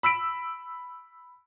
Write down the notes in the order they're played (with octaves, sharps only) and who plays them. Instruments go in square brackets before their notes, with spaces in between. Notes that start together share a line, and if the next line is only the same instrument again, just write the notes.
[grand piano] B5 E6 B6 D7